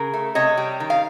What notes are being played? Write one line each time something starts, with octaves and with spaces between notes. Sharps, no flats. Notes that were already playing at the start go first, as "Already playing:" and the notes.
Already playing: C#3 G#4 A#4
A3
C3 C#5 D#5
G3
D#3
F5